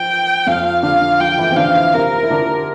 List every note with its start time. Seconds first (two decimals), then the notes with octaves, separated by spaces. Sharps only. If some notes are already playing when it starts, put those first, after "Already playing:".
Already playing: F3 G5
0.46 F2 F3 F5
0.83 D3 D4 F5
1.20 F3 F4 G5
1.38 E3 E4
1.51 C4
1.57 D3 D4 F5
1.75 E3 E4
1.94 C3 C4 A#4
2.15 F4
2.23 E4
2.30 D3 D4